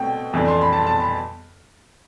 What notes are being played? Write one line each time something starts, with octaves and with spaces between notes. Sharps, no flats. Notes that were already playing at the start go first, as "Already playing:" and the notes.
Already playing: B2 A3 C4 G5
F2 E3 A3 D4
C6
B5
A5
A5
B5